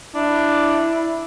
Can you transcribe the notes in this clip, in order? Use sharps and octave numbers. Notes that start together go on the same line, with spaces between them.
D4 E4